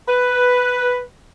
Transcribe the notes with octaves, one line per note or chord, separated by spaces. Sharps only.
B4